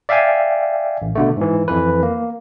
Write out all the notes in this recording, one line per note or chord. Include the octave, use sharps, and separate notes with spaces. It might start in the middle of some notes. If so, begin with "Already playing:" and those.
D5 E5 F5 G5 G#5
A1
B2 D3 A3
G#2 E3
F2 E3 B4
A#3